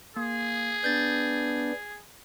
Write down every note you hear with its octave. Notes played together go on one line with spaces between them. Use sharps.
A#3 G#4
B3 D4 G6 A6